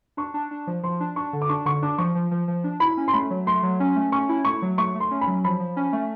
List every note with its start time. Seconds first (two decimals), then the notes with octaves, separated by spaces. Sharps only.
0.17 D4 C#6
0.34 D4
0.51 D4
0.67 F3
0.83 F3 C6
1.00 D4
1.16 D4 C#6
1.33 D3
1.42 D6
1.49 D4 C#6
1.65 D3 C#6
1.82 D4 D6
1.98 F3 C#6
2.15 F3
2.31 F3
2.48 F3
2.64 D4
2.80 E4 B5
2.97 C#4
3.08 C6
3.13 A3 B5
3.30 F#3
3.46 A3 C6
3.63 F#3
3.80 C#4
3.96 A3
4.12 C#4 C#6
4.29 E4
4.45 A3 C#6
4.62 F#3
4.78 A3 C#6
4.95 A3
5.00 C6
5.11 C#4
5.21 B5
5.27 F#3
5.44 F3 B5
5.60 F3
5.76 C#4
5.93 A3